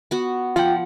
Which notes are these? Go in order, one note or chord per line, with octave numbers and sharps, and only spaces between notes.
B3 F#4
F3 F4 F#5 G5